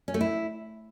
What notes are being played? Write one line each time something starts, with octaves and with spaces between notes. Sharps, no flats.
C#4
A3
E4